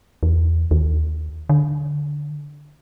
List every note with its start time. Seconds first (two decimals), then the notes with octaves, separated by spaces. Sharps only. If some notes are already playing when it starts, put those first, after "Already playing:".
0.23 E2
0.71 D#2
1.49 D3